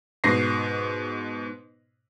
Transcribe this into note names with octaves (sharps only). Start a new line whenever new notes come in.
G#2 B2 A#6 C7